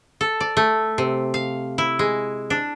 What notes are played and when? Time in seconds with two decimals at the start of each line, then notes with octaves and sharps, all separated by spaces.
0.21 A4
0.40 D5
0.57 A3
0.98 C3
1.34 F5
1.78 E4
1.99 G#3
2.50 D4